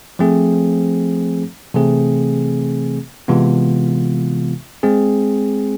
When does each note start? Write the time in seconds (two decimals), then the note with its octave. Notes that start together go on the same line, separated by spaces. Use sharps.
0.19 F3 A3 C4 G#4
1.74 C3 E3 A3 C4 G#4
3.28 C3 E3 G#3 B3 F4
4.83 G#3 C4 G#4